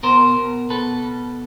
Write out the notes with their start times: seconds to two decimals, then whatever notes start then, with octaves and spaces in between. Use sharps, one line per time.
0.03 B2 A#4 C5
0.37 B2
0.70 B2 A4 B4
1.03 B2